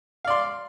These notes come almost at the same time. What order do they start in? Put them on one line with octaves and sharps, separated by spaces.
F5 D5 C6